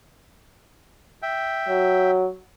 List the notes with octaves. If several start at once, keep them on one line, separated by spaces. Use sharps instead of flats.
E5 G5
F#3